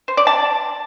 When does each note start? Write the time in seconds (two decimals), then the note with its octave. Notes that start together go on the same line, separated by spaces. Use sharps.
0.08 C5
0.17 D5
0.27 A5